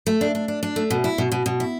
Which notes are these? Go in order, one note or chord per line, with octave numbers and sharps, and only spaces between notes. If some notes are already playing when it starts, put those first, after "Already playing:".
A3
D4
D4
D4
D4
A3
B2
E4
B2
B2
B2
E4